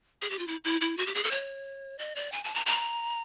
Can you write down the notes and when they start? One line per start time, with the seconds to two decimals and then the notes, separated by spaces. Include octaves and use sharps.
0.22 G#4
0.30 G4
0.39 F4
0.47 E4
0.65 E4
0.81 E4
0.98 F#4
1.06 G4
1.15 G#4
1.24 A4
1.31 C#5
1.99 D#5
2.15 D5
2.32 G#5
2.44 A5
2.55 A#5
2.66 A#5